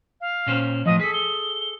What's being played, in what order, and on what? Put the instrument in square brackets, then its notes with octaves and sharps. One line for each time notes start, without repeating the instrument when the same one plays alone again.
[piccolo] F5
[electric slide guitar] A#2 C#4 C5
[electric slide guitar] A2 F3 [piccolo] D#5
[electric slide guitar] G#4 A4 [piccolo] B6
[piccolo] G7